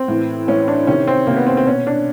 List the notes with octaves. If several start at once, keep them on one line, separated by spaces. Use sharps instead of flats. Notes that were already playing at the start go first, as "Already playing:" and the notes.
Already playing: C4
A2 E3
A2 E3 C#4
D4
C3 D#3 C#4
C4
C3 D#3 A#3
B3
C4
C4
B2 C#4
D4